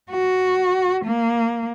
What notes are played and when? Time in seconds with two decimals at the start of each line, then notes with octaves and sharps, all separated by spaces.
0.11 F#4
1.05 A#3